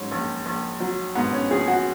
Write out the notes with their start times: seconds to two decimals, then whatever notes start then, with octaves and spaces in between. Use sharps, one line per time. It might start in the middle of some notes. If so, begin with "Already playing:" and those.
Already playing: G#2 F#3 C#4
0.12 A#1
0.46 A#1
0.80 F#3
1.15 G#2 B3
1.33 C#4
1.51 A#1 G#4
1.68 F#4